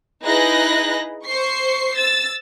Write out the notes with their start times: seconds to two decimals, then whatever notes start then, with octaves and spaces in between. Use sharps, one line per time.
0.24 D#4 E4 G#4 B4 F#6 A#6
1.25 C5 C#6 C7
1.97 E6 A6